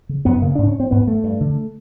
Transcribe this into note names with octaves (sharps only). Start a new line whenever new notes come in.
C#3
F#2 B3
C#3 A#3
G#2 D4
C#4
C4
G#2 B3
A3
G2
D3